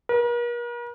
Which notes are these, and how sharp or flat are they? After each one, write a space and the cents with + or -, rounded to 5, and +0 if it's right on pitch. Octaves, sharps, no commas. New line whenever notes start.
A#4 +45